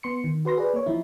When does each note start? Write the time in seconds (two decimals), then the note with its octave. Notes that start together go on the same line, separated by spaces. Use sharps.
0.03 B3 C6 C#7
0.24 D#3
0.45 F#4 B4 C6 A#6
0.58 G#4 B4 D5
0.74 A#3 C#5
0.86 F3 D#4 E4